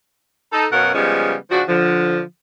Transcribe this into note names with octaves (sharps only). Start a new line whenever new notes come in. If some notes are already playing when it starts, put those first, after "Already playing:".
D#4 A4
F#2 B2 C#4 A#4 F5 F#5
C#3 F3 G3 G#3 B3 C#4
C#3 F3 D4 F#4
D3 F3